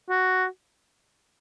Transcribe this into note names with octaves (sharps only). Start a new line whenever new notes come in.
F#4